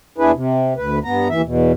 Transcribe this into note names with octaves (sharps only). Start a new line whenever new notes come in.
E2 D4 E4 G#4 B4
C3
D2 B4
G2 B3 A#5
D#2 E3 E5
E2 B2